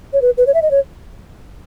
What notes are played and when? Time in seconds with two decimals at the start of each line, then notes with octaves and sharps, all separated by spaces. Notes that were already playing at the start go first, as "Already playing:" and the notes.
0.13 C#5
0.22 B4
0.38 B4
0.47 C#5
0.54 E5
0.62 D#5
0.71 C#5